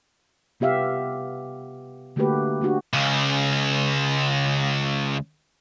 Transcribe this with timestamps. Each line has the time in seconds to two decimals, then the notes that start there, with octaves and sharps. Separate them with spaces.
0.60 C3 B3 G4 E5 F5
2.16 D3 A3 A#3 F#4 G4 B4
2.61 A3 D4 F#4 G4
2.93 C#2 C#3